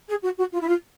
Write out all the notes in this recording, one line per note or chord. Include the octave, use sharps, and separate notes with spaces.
G#4
F#4
F#4
F4
E4
F4